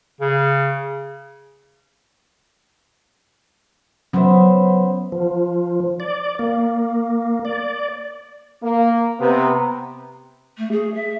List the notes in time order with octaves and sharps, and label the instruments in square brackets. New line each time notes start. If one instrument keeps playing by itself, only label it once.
[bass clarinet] C#3
[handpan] F#3 C#4 [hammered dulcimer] B3 C5 E5
[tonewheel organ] F3
D5
A#3
D5
[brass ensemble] A#3
C3 B3 A#5
[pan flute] A3
G#4
E5